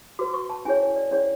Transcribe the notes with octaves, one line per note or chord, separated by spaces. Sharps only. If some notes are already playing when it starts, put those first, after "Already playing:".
F#4 B4 D6
C#6
A5
C#4 E4 G#4 C#5 G#5
D5
C#4 E4 G#4 C#5 D5